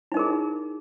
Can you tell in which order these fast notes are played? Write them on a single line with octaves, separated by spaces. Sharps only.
E4 D#4 A#4 G#4